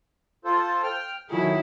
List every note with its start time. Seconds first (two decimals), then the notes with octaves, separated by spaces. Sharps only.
0.45 F4 A4 C5
0.83 G5 F6
1.30 D#3 F#3 A3 E4 G#4